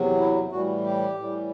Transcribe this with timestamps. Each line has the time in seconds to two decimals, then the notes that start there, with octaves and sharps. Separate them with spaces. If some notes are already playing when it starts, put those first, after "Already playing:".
Already playing: E2 C3 F#3
0.19 E4
0.52 A2 E3 G3 F#4
0.85 G4
1.18 A2 E3 G3